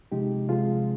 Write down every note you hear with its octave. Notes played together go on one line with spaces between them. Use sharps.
C3 F3 G#3 D#4 G4
C3 F3 G#3 F4 G#4